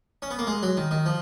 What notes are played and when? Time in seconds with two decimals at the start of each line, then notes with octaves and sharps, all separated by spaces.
0.22 C#4
0.31 B3
0.39 A#3
0.47 G#3
0.63 F#3
0.77 D#3
0.91 D#3
1.06 F3